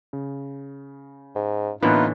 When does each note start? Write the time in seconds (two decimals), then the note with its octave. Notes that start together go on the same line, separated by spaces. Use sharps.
0.13 C#3
1.36 G#2
1.82 A2 D3 E3 A#3 B3 D#4 F4 B4